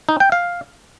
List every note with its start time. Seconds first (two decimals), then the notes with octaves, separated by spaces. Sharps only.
0.09 D#4
0.20 G5
0.32 F5